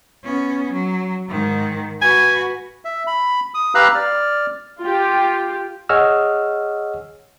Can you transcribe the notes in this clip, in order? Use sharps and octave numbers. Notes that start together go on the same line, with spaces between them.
B3 C#4
F#3
G#2 D#3
F#4 B4 G#5
E5
B5
D#6
G4 B4 F5 A#5 E6 F#6
D5 F6
F4 G4
G#4 C#5 D#5 F#5 E6 F6